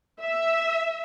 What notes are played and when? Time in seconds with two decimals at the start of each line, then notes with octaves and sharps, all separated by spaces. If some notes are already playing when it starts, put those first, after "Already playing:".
0.21 E5